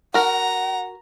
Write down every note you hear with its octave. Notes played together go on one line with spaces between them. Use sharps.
F#4 A#4 F#5 A#5